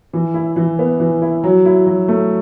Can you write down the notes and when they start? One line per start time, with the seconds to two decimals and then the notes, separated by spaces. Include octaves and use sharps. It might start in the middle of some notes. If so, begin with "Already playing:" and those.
0.13 E3
0.34 E4
0.56 E3
0.79 B3
1.00 E3
1.22 E4
1.44 F#3
1.65 E4
1.87 F#3
2.08 A3